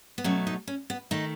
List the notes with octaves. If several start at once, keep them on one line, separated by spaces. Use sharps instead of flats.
B3
B2 F#3 A3 C#4
D#4
C#4
B3
D#3 A3 D#4